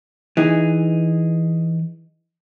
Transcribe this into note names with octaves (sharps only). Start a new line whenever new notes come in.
E3 D#4 G#4